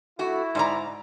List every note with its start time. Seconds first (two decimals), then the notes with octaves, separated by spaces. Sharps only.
0.19 A3 E4 F#4
0.55 G#2 D5 A#5